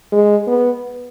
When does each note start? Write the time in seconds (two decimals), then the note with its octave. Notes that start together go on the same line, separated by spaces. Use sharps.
0.12 G#3
0.47 B3